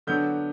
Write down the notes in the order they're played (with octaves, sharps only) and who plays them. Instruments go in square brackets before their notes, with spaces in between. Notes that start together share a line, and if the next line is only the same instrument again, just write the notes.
[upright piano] D3 F#3 B3 D4 G6